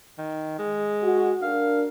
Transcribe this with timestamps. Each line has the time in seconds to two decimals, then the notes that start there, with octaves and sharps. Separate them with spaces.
0.18 D#3
0.59 G#3
1.02 F#4
1.42 D4 A#4 F5